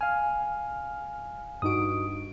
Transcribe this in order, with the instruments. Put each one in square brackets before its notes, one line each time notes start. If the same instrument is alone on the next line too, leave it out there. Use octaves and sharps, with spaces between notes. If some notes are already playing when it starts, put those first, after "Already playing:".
[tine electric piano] F5 G#5 [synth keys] F6
[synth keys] G2 D#4 D7 [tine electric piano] F#4 D#6